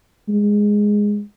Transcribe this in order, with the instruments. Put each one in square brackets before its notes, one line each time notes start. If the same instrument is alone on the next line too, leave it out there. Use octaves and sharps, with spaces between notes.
[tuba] G#3